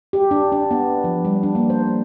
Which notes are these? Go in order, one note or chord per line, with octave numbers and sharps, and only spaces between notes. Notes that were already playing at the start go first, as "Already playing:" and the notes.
G4
D4
D4
B3
F3
G3
D4
A#3
C5